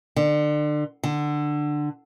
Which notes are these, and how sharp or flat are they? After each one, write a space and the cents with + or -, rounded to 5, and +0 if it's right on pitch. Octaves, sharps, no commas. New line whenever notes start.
D3 +30
D3 +15